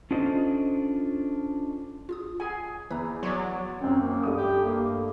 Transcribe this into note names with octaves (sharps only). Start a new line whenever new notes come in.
C#4 D4 F4 A4 C5 D#5
F4 G#4 D#6
G#4 F#5 G#5
E2 E4 B4 A#5
F#3 C#5 D5 C6
F#2 C4 C#4
A#3
G2 A3 D#6
G4
A#3